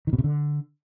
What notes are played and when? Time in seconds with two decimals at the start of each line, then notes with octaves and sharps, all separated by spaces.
0.07 D#3
0.13 B2
0.18 C3
0.24 D3